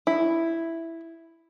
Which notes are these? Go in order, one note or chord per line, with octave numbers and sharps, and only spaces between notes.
E4